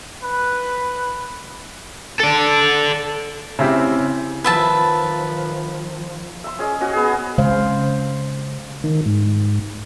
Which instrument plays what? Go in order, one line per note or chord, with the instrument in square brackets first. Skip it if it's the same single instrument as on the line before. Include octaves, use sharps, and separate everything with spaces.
[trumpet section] B4
[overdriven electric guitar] A4 D5
[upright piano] C#3 C4 E4 G4
[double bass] D#3 F3 [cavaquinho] B4 E5 A5
[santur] E5 C6
C#4 G#4 D#5
C#4 F#4 G#5
B3 G#4
[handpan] C#3 G#3 C5 F5
[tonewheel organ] D#3
G#2